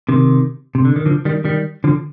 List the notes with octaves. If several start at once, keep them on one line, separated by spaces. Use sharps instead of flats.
C3 D#3
C3
D3
D#3
D3 F3
D#3 G3
D#3 G3
D3 F3